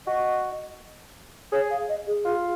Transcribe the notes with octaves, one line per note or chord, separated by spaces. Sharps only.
F#4 D#5
G#4 C#5
F5
D#5
G#4
F4